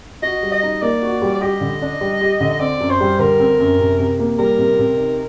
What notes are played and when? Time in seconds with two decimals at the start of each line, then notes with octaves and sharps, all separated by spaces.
0.22 F#4 D#5
0.43 G3
0.52 D#5
0.63 D#4
0.82 A#3 D5
1.02 F#4
1.22 G3
1.34 D5
1.41 G4 D#5
1.61 D3
1.82 D4
2.01 G3
2.21 G4
2.41 D3
2.50 D#5
2.60 C4 D5
2.80 F#2
2.90 C5
3.01 G3
3.19 D3 A#4
3.40 C4
3.60 F#2
3.79 C3
3.99 C3
4.19 A#3
4.39 G3 A#4
4.58 C3
4.79 C3
4.97 D#4